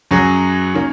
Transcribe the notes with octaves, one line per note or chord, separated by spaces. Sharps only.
F#2 F#3 C#4 G#4
D#3 A#3 C#4